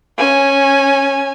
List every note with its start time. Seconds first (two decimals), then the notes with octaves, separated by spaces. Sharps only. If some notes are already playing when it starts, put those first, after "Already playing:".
0.17 C#4 G#5